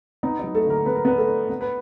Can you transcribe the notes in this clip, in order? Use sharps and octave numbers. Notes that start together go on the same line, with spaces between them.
B3 D#4
F#3 D#4
A3 A4
D3 A#3 A#4
B3 B4
A#4
B3 D4 B4
A3 A4
D4
B3
B4